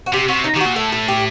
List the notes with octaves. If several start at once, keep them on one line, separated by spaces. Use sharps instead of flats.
F#4
C3 G4
C3 F#4
D#4
D#3 F#4 G4
A#2
A2 A4
A4
G4